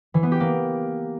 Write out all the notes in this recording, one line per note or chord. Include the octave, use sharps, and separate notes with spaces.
E3
B3
G4
A#3